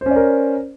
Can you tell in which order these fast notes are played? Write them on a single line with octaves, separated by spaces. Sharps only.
C5 C#4 D5 A#4